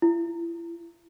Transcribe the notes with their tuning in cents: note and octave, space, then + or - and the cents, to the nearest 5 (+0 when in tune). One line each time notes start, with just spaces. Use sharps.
E4 +35